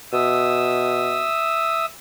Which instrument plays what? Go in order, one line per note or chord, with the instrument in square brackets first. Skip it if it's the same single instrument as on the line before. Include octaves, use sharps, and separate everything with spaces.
[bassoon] B2 [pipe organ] E5 D#6 E6